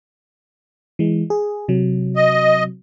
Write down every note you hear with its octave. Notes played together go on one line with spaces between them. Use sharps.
E3 G#3
G#4
C3 F#3
D#5